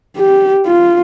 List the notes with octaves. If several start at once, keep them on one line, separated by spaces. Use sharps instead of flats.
G4
F4